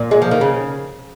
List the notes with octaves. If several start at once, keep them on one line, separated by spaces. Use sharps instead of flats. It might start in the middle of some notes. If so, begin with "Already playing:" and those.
Already playing: A#2
G#3
F3
D#3
C#3